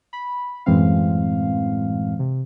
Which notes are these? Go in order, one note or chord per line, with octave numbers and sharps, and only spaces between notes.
B5
F#2 A2 E3 G#3 C4 F5
C3